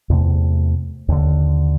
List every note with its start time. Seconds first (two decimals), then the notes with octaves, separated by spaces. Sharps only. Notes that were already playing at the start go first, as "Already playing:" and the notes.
0.10 E2 C3 A3
1.08 D#2 D3